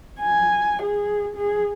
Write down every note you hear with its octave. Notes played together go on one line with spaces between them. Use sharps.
G#5
G#4
G#4